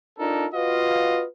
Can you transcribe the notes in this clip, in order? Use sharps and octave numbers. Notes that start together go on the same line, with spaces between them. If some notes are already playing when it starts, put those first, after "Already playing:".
D4 D#4 F4 A4 A#4
F4 F#4 B4 D#5 F5